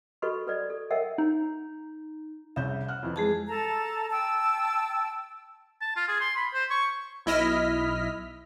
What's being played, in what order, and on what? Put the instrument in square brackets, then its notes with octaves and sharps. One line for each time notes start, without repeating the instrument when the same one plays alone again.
[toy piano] F#4 A4 B4 D#5 B5 C#6
A4 B4 D5 D#5
A4
A#4 C#5 D#5 E5 F#5 G5
[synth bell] D#4
[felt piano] C2 C#3 G6 [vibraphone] E5
[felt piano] F#5 F6 F#6
F2 E3
[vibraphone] G#3 G#4 A5
[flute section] A4 A5 A#5
G5 A5 E6
[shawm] A5
F4
G#4
C6
B5
C5
C#6
[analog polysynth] B1 E4 D#5 F6 B6